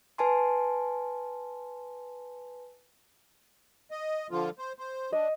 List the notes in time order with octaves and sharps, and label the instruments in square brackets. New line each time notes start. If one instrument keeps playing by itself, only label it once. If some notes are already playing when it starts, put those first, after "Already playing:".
[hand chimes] B4 G#5 A5 C6
[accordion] D#5
D3 F3 F4
C5
C5
[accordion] D4 [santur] D#5